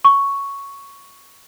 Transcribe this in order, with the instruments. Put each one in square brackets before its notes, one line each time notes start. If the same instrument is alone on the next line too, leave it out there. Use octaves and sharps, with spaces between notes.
[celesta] C#6